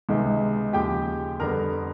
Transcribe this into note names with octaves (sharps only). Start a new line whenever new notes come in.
C#2 C3 D#3 G#3 B3
D#2 C#3 F3 G4 G5
F2 D3 G3 B3 A#4 A#5